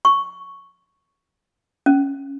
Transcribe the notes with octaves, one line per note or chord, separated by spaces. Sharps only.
C#6
C#4